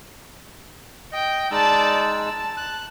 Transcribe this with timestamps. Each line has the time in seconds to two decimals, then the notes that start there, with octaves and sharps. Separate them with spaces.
1.12 D#5 G5
1.51 G#3 D#4 D5 A5 E6
2.18 A5
2.57 F#6